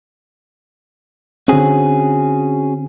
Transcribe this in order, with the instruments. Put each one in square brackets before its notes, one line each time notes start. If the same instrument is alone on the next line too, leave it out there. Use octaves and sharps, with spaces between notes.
[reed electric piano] D3 C4 [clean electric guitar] C#4 F#4 G#4